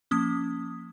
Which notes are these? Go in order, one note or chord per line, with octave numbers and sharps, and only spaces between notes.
F3 A#3 C#4 D#6